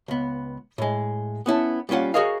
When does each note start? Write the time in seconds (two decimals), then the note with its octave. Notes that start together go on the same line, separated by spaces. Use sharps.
0.08 C#2 B3
0.78 A2 G#3
1.46 B3 C#4 E4 A5
1.89 G3 A#3 C#4 F4 F#5
2.14 F#4 G#4 A#4 C#5 D#5 F5